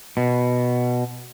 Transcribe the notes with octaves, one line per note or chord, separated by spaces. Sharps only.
B2